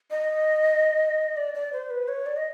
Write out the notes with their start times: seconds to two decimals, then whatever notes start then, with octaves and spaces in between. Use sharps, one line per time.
0.11 D#5
1.37 D5
1.54 D5
1.73 C5
1.90 B4
2.08 C#5
2.26 D5
2.37 D#5